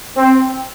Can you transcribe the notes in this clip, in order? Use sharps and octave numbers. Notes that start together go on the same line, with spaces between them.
C4